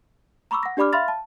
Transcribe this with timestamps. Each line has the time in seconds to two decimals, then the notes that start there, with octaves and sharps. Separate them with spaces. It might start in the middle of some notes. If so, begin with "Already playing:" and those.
0.51 A#5 B5 C#6 D6 E6
0.63 F#5 A#6
0.77 D4 G4 D5 B5 D6 F6
0.93 E5 F5 B5 C6 F6 A6
1.08 A5